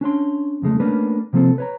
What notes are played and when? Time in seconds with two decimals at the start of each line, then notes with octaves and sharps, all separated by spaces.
0.01 C#4 D4 C#5 C6
0.62 F2 C#3 G#3 A3
0.80 A3 A#3 C#4 D4 B4
1.33 C3 F3 A#3 C4 A4
1.58 B4 C#5 A#5